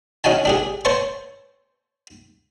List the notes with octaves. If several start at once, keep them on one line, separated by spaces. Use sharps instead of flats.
C#4 D#4 F#4 G#5 A5
D4 G4 G#4
C5 C#5 A5 C#6